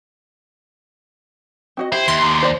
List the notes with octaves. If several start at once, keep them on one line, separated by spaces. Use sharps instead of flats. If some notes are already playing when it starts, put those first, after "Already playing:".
C4 F#4 D#5
E4 G4 C5
D#2 C6
D3 D#3
C5 D5